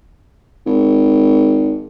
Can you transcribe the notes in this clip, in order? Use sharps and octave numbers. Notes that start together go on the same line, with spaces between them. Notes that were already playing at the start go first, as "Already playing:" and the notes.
G#1